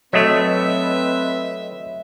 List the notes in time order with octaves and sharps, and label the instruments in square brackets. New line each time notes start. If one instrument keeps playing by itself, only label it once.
[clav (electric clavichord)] F#3 A3 [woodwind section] C4 B4 [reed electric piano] C#5 D#5 [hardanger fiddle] E5